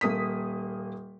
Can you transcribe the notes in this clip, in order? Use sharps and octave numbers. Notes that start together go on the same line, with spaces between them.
D#1 A#3 D#6 B6